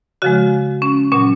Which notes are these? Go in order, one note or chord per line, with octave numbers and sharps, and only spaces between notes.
C#3 F3 G#3 F#4
C#4
A#2 F#3 C#4